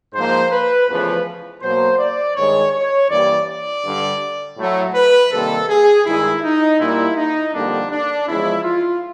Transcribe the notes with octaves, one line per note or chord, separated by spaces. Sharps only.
G#2 F3 A#3 C5
B4
E2 C#3 F3 A3 B4
B2 F#3 A#3 C5
D5
G2 D#3 G#3 C#5
C#5
G2 E3 G3 A#3 D5
D5
G2 D3 G3
A2 F#3 A3
B4
C3 D#3 G3 A#3 A4
G#4
G2 D#3 G#3 E4
D#4
A#2 G3 A#3 E4
D#4
F2 D3 G3 A#3 D4
D4
E2 C#3 F3 G#3 E4
F4